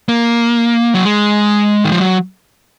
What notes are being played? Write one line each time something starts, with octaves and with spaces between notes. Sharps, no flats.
A#3
F#3
G#3
D#3
F3
F#3